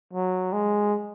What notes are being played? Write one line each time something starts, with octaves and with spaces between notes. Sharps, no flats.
F#3
G#3